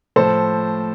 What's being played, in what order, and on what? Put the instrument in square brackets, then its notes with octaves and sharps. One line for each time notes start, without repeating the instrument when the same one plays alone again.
[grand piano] A2 F3 A4 C5